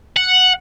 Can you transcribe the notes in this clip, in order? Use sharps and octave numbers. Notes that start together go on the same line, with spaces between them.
F#5